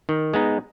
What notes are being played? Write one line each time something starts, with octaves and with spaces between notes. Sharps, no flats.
D#3
G#3 B3 D#4